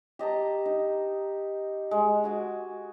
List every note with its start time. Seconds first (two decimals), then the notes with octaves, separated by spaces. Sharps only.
0.19 G4 D#5 A5 A#5
0.66 D#4
1.91 G#3
2.24 F#4 G#5 D6